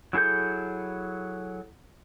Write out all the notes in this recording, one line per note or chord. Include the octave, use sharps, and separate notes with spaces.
F#3 E4 G#4 A4 G6